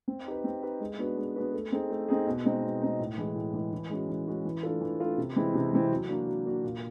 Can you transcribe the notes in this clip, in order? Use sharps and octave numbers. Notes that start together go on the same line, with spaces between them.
C4
D#4 G4 B4
C4
D#4 G4 B4
G#3
B3 D4 F#4 B4
G#3
B3 D4 F#4 B4
A3
C4 D#4 G#4
A3
C4 D#4 G#4
B2
G#3 C4 D#4
B2
G#3 C4 D#4
A2
E3 G#3
A2
E3 G#3
E3
G#3 C#4 F#4
E3
G#3 C#4 F#4
E3
A3 D4 F4 A4
E3
A3 D4 F4 A4
C3
E3 G#3 C4 E4
C3
E3 G#3 C4 E4
F#3
A#3 D4 F#4
F#3
A#3 D4 F#4
A#2